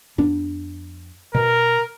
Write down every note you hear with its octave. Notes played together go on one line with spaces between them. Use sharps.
F2 B3 D4
B2 A#4